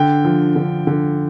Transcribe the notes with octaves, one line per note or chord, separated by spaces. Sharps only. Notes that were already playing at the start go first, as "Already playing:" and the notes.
Already playing: D3 G5
F3
D3
D3